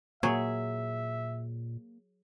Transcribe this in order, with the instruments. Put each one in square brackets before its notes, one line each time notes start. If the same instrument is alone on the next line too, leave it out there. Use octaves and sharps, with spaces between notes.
[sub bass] A#2 [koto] F#3 G#4 [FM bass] A#3 [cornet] E5